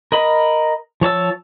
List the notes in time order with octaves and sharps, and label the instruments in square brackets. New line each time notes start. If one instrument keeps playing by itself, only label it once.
[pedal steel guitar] A#4 D#5 B5
F3 C#5 A5 E6